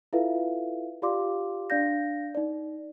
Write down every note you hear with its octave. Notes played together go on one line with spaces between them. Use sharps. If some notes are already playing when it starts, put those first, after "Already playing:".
E4 F4 A4 B4 E5 F5
F4 G4 D5 F5 C6 D6
D4 D5 F5 G6 A#6
D#4 D5